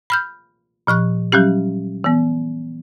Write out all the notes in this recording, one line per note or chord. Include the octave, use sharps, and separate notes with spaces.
B5 F6 G6
A#2 F3 C#6 F#6
F#3 G3 C#4 G4
E3 B3